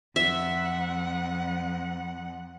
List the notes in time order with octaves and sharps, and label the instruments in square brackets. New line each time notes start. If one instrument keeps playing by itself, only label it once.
[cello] F2 F#5 [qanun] E5